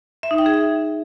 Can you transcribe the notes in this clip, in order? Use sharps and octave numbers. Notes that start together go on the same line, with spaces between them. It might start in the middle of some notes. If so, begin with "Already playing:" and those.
E5
D#4
G5
G#4
E5